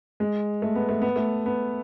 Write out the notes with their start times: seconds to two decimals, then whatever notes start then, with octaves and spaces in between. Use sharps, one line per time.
0.20 G#3
0.62 A3
0.75 B3
0.89 A3
1.02 B3
1.16 A3
1.46 B3